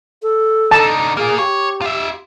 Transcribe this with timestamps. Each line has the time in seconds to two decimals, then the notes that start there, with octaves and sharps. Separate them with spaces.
0.22 A4
0.71 D3 D#4 A5
1.17 A#3 F4 G#4
1.39 G4 C#5
1.81 F4 E5